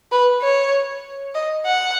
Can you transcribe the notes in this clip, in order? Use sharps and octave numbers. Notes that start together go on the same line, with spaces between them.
B4
C#5
D#5
F#5